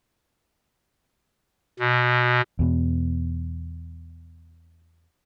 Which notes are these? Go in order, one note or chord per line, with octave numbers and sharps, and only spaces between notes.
B2
E2 B2